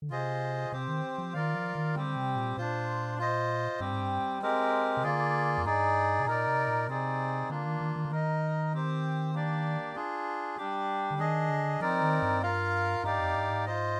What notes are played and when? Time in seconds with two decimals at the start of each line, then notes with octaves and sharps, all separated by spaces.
0.02 D3
0.10 C3 F4 G#4 C5 D#5
0.72 C3 C4 G4 C5
0.88 D#3
1.18 F3
1.33 D#3 F4 A#4 D5 F5
1.54 F3
1.75 D#3
1.95 D3 G3 C4 G4
2.16 C3
2.36 A#2
2.57 A#2 D4 F4 C5
3.18 F4 C5 D#5
3.80 G2 G3 C4 G4
3.91 G#2
4.01 G2
4.42 G#3 C4 G4 A#4
4.97 C3
5.03 D3 A#3 F4 G#4 D5
5.57 F2
5.65 G2 D#4 G#4 D5
6.20 C3
6.26 A#2 D#4 A#4 D5
6.47 C3
6.68 A#2
6.88 C3 C4 D#4 G#4 D5
7.49 D3 A#3 D4 F4
7.65 D#3
7.81 D#3
7.96 D#3
8.05 D3
8.11 D#3 D#4 A#4 D#5
8.73 C4 G4 C5
9.34 A#3 D4 G4 D5
9.95 D4 F4 G#4
10.57 G3 D4 G4
11.11 D3
11.18 D#3 D4 G#4 D#5
11.49 D3
11.80 F3 C4 D#4 A#4 D5
12.01 D#3
12.22 G2
12.42 F4 A#4 F5
13.03 G2 D#4 G4 D5 F5
13.19 F2
13.35 G2
13.50 G#2
13.66 F4 C5 D#5